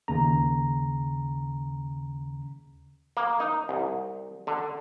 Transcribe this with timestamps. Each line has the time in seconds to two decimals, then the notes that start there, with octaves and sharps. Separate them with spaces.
0.08 D#2 C#3 A#5
3.17 A#3
3.40 D#4
3.69 C2
4.47 D3